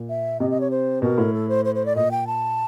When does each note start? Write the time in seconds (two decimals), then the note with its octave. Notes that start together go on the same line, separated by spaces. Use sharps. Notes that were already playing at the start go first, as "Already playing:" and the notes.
Already playing: A#2
0.09 E5
0.40 C3 D#5
0.50 D#5
0.61 C#5
0.71 C5
1.02 B2 A#4
1.18 A2
1.33 A4
1.49 C5
1.65 C5
1.75 C5
1.86 D5
1.95 A#2 D#5
2.11 G5
2.27 A5